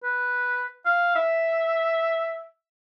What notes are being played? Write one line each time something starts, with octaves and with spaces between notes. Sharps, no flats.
B4
F5
E5